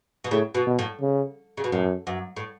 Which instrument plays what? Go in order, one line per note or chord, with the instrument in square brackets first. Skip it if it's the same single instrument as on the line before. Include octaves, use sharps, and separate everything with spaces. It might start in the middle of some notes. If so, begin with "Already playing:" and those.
[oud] B2
[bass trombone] A2 [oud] C#3
[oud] B2
[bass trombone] B2
[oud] A2
[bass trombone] C#3
[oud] C#3
B2
[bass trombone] F#2 [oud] A2
[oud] F#2
A2